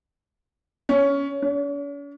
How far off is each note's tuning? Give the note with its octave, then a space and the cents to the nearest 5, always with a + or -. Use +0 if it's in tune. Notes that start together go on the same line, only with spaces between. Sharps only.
C#4 +15
C#4 +45